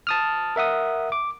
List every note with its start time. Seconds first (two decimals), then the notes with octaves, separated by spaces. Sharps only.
0.07 A5 D#6 F6
0.56 A#4 E5 F#5 D#6
1.12 D6